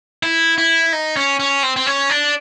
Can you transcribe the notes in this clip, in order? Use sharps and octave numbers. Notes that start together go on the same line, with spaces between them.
E4
E4
D#4
C#4
C#4
C4
C4
C#4
D4